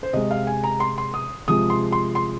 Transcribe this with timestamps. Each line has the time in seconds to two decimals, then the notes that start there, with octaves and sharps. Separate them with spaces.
0.03 C5
0.13 C3 G#3 D#5
0.31 F5
0.47 G#5
0.64 A#5
0.80 C6
0.98 C6
1.14 D#6
1.48 C3 F3 G#3 D#6
1.70 C6
1.92 C6
2.15 C6